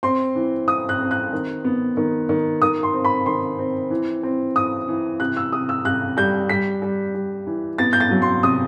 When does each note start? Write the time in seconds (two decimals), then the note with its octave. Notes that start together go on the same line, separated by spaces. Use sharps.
0.03 C4 C6
0.35 E3
0.67 E3 D#6
0.89 F#6
1.00 C4
1.11 F#6
1.33 D#3
1.64 B3
1.97 D#3
2.29 D#3
2.62 D#3 D#6
2.83 C6
2.94 C4
3.05 B5
3.26 D#3 C6
3.59 C4
3.90 E3
4.23 C4
4.56 E3 D#6
4.88 E3
5.20 C3 F#6
5.37 E6
5.53 C3 D#6
5.69 E6
5.85 C3 F#6
6.17 G3 G6
6.49 G3 B6
6.82 G3
7.14 G3
7.47 E3
7.78 B3 A6
7.93 G6
8.00 A6
8.11 F#3
8.22 C6
8.43 C3 D#6